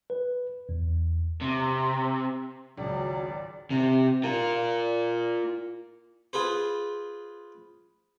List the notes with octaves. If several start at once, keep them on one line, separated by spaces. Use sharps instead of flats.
B4
E2
C3
G#1 C#2 F#3 G#4 D5
C3
F4 A#4
F4 G#4 B4 C5